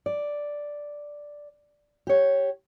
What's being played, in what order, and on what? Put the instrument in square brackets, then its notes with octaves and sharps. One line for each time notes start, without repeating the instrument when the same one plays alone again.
[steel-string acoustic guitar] D5
G4 C#5